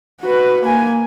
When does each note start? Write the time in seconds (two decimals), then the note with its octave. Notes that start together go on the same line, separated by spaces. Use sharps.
0.21 F#4 B4
0.61 A#3 G#5